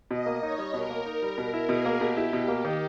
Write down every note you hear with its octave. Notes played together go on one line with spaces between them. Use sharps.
B2 D#5
A#3
D#4 C#5
G3
B2 A#4
A#3
D#4
G3
B2 A#4
E4
B2 G#4
A#3
B2 G4
E4
B2
A#3
D#3